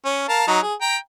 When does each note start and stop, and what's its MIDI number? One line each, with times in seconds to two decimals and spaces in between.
0.05 0.26 61
0.29 0.47 70
0.29 0.47 77
0.29 0.47 81
0.47 0.59 54
0.47 0.59 63
0.62 0.74 68
0.81 0.96 79
0.81 0.96 82